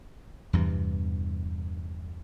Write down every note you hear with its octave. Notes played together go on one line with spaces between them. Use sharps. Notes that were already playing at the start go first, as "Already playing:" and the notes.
E2 G2 C3 E3